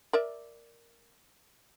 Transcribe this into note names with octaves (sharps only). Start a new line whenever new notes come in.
A#4 D5 E5